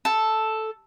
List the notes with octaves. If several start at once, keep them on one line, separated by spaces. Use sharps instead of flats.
A4